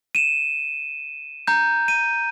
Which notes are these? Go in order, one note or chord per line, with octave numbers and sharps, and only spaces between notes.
D#7 E7
A#5 G6
D#7